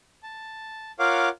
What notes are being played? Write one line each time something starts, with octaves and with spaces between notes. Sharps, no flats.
A5
F4 A#4 C#5 F5 F#5 D6